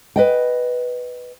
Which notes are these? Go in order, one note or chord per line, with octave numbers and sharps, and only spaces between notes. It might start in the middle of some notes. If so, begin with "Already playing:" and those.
B4 D#5 G5